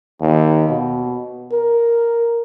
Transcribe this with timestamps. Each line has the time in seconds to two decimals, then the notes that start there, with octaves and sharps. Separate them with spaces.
0.21 D#2
0.69 B2
1.52 A#4